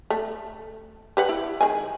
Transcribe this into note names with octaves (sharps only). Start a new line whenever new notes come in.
A3
G4 B4 F#5
E4
D#3 G#3 G#5